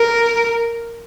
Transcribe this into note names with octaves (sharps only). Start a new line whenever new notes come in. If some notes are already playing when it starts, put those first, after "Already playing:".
Already playing: A#4